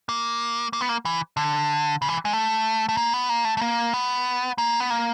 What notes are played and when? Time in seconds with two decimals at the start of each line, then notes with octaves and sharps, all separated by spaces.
0.09 A#3
0.73 A#3
0.81 B3
0.89 A#3
1.05 E3
1.37 D3
2.02 C#3
2.09 E3
2.25 G#3
2.33 A3
2.89 A3
2.97 A#3
3.14 B3
3.29 A#3
3.45 A3
3.57 A3
3.61 A#3
3.94 B3
4.58 A#3
4.80 B3
4.90 A#3